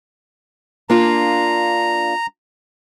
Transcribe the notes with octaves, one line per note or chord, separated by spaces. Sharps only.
A#3 D4 F4 A#5